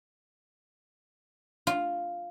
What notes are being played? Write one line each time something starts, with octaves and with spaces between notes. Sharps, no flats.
F4